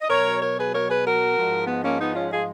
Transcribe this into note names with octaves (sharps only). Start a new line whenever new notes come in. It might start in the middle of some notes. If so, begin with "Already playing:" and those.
D#5
B2 F#3 A#4 C#5
A#4 C#5
G#4 B4
A#4 C#5
G#4 B4
F#4 A#4
G#2 F3 G#3
B3
A#3 C#4
B3 D#4
C#4 F4
F4 G#4